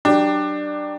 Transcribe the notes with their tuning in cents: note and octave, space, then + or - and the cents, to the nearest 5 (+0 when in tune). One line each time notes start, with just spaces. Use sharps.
F#3 +20 D4 +20 G4 +0